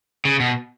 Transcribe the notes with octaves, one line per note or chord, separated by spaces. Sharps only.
C#3
B2